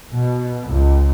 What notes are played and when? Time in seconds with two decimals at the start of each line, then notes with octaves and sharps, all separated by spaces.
0.12 B2
0.67 C#2